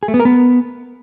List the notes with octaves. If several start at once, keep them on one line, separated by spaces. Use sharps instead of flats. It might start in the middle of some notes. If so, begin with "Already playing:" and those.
G#4
A3
B3
A#4
B3